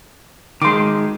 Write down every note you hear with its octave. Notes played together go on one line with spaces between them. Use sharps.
D#3 G#3 C6 D6